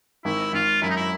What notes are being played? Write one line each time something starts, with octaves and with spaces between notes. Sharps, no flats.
G#1 E4
G#1 F4
F#2 E4
D#4
E4